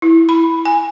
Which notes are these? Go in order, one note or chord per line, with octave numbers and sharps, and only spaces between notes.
E4
B5
G#5